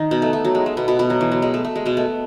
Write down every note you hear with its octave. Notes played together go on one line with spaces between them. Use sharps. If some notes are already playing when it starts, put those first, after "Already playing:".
Already playing: D#3 D#4
B2 B3
A3
A3
F#3
G#3
A3
B2 B3
B2 B3
B2 B3
F#3
E3
F#3
G#3
A3
A3
G#3
B2 B3
A3